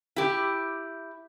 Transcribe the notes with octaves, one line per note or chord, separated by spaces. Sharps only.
E4 G4